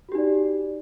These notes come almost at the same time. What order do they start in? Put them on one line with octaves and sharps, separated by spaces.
F#4 G4 D#4 D5